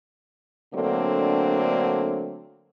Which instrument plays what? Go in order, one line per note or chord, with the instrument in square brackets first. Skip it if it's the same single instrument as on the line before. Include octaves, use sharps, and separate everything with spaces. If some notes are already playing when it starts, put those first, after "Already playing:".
[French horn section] D3 F#3 A3 A#3 C4 D4